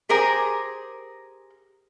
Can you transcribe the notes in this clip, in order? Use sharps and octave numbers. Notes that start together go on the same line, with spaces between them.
G4 G#4 A#4 C5 G#5